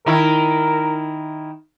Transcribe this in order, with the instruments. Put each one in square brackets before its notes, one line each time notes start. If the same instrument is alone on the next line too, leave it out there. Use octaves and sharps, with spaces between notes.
[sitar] D#3 E4 [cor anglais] A#4